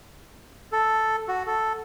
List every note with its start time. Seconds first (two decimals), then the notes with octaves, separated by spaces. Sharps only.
0.72 A4
1.28 F#4
1.47 A4